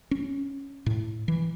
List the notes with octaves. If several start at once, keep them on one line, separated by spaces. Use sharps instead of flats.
C#4
A2
E3